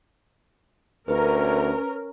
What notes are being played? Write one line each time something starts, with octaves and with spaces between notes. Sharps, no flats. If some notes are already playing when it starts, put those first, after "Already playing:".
D2 C#4 A#4 B4